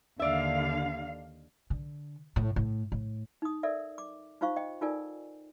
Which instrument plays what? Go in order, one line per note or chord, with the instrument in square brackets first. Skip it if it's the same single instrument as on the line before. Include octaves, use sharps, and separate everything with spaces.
[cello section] D#2 D3 F5 [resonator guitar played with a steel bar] D5 E5
[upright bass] D3
A2
A2
A2
[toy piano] D#4 D#6
A4 A#4 D5 E5
D6
D#4 F4 C5 F5 C#6
D#5 G5
D#4 F4 A4 A#4 D5 G#5